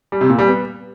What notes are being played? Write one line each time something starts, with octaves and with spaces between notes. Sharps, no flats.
G3
C3
A#2
G3
B3